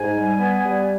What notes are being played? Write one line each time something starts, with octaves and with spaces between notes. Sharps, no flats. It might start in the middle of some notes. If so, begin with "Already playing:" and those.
Already playing: G#2 G#5
G3
B3
G3